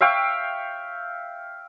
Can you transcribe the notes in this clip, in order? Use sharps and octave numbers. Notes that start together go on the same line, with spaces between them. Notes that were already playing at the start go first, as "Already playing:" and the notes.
E5 F5 G5 C#6